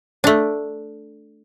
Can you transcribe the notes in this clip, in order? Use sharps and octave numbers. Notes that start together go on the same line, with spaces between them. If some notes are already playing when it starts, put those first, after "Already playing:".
A3 D4